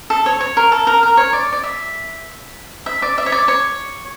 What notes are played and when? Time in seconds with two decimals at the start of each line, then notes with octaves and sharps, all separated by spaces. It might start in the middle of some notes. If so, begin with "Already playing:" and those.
0.10 A4
0.26 C#5
0.41 C#5
0.57 A#4
0.72 A4
0.87 A#4
1.03 A#4
1.17 C#5
1.33 D5
1.53 D5
1.64 E5
2.86 E5
3.02 D5
3.18 E5
3.26 C#5
3.32 D5
3.48 C#5